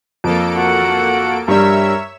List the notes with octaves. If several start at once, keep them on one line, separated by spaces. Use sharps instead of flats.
F2 A#3 A4 D7
F#4 F#5
G2 G3 A#4 C#5 E5 E6